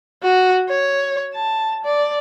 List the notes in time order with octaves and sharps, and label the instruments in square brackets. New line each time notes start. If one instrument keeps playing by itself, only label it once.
[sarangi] F#4
C#5
A5
D5